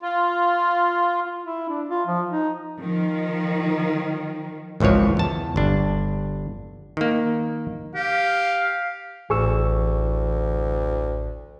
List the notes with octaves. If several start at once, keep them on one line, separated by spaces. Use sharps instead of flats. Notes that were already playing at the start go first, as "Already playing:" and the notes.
F4
E4
D4
F4
F3
D#4
D#3 F3
G#1 C#2 E3 F3 C#5
E2 A5
G1 D4
D#3 A#3
G4 F5
A1 D2 E3 G#4 C#6 E6